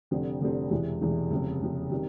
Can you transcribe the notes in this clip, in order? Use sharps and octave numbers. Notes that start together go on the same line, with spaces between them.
F1 F2 D3 G3 C4
F1 F2 D3 G3 C4
E1 E2 C3 E3 G#3
E1 E2 C3 E3 G#3
F#1 F2 C3
F#1 F2 C3
C3 D#3 G3